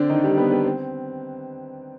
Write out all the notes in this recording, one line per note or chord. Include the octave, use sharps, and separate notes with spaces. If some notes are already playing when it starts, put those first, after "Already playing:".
Already playing: D3 C4 D4
D#3 D#4
G3 G4
B3 B4
B3 B4
C4